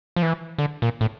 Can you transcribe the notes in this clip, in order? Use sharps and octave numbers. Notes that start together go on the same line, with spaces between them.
F3
E3
D3
A#2
A2